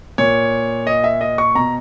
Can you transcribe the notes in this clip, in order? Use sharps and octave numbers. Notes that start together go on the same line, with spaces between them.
A#2 C#5
D#5
E5
D#5
C#6
B2 A#5